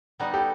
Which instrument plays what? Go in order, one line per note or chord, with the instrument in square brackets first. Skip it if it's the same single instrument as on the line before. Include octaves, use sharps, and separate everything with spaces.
[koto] G3 B3 D#4
[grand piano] G4 A4